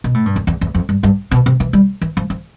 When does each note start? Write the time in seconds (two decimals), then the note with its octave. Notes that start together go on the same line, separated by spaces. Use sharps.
0.04 B2
0.14 A2
0.26 G2
0.36 F2
0.47 E2
0.61 E2
0.75 F2
0.89 G2
1.03 G2
1.31 B2
1.46 C3
1.60 E3
1.73 G3
2.01 E3
2.17 F3
2.30 F3